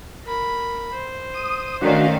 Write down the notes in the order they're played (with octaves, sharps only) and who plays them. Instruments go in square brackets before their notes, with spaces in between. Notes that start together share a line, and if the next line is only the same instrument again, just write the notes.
[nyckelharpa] A#4 B5
C5
[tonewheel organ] D#6
[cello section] D#3 A3 [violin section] C#4 D5 F5 [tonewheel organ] D4 F#4